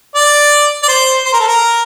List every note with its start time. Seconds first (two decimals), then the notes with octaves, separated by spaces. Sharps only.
0.15 D5
0.83 D5
0.88 C5
1.25 C5
1.33 A#4
1.40 A4
1.48 A#4